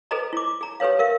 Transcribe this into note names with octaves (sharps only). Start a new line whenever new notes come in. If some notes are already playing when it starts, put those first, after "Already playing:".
G#4 A4 B4 C5 D#5 A#5
E4 D6
G#4 A#5
G4 A4 B4 C#5 F5
A#4 E5 F5